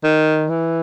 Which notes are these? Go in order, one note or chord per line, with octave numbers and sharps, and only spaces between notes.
D#3
E3